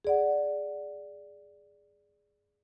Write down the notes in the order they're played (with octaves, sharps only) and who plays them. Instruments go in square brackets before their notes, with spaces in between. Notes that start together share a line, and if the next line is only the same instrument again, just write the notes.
[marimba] G#4 D5 F#5